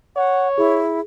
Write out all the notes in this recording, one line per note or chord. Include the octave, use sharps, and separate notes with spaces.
C#5 F#5
E4 G#4